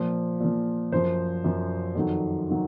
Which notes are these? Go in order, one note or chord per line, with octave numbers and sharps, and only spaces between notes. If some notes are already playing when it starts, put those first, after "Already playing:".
Already playing: A#2 F3
A#2 F3
F#2 F3 C5
F#2 F3
F2 D#3 F#3
D#3 F#3